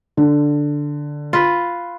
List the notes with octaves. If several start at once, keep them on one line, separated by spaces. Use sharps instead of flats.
D3
F4 B4